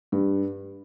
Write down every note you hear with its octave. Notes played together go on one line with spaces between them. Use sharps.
G2